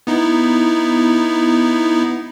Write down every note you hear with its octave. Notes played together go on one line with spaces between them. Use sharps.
B3 D#4 E4